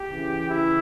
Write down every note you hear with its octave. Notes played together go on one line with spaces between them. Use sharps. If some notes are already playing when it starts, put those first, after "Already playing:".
Already playing: G4
C#3 E3
E4